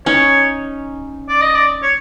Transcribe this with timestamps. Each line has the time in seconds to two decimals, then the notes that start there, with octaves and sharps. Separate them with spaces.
0.06 C#4 D#4 C#5
1.29 D5
1.41 D#5
1.55 D5
1.83 C#5